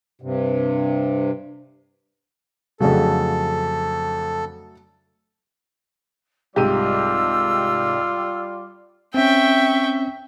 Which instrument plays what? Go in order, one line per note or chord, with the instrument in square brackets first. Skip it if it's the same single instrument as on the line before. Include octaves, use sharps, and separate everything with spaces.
[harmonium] G2 C3
[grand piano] F2 C#3 [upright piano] F#3 A3 D4 [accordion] A4
[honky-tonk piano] C2 G#2 D#7 [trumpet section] G3 F4 D5 [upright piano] G4 [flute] E6
[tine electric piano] C4 C#4 [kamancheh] E5 [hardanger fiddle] G5 C#6